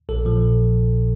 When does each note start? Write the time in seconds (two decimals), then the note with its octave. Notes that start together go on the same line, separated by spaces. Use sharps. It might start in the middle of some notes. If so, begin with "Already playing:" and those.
0.09 A#1 A4
0.25 A#2 F3